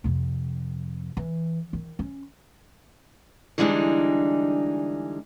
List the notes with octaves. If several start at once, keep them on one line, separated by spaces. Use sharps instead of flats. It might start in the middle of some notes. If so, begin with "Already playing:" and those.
F2 C3
E3
D#3
C#4
D3 E3 G3 G#3 D4 D#4